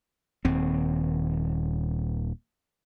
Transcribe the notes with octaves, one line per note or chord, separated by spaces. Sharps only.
D#1 D#2 C4